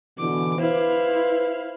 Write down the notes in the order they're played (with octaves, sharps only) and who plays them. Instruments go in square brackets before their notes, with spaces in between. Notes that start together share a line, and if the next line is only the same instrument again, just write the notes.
[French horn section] B2 D3 E3 [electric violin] D6
[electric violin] E4 F5 [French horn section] B4 C5